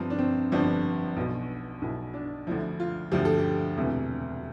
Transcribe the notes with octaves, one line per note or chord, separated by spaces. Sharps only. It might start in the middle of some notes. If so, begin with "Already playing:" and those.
Already playing: G1 G2 F3 C4
D4
C4
G1 G2 F3 D4
B1 B2
B1 B2 E4
D4
D2 D3 F3 E4
F4
D2 D3 F3 G4
A4
G4
E1 D2 C3 E3